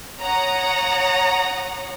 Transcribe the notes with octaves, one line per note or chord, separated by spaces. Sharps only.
C#5 F#5 A#5 D#6